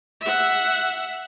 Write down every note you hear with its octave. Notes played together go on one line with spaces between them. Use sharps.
E5 F#5